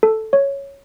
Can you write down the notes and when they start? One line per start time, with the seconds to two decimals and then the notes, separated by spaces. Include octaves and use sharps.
0.03 A4
0.33 C#5